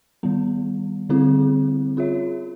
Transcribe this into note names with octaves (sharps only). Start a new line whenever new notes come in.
D#3 G3 B3
D3 G3 C4 E4 G#4
C#4 F4 G#4 C#5 E5